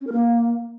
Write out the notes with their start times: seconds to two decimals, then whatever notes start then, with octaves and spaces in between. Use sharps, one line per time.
0.01 C#4
0.07 A#4
0.13 A#3